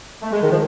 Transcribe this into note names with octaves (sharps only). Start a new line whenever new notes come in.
A3
G#3
D#3
F3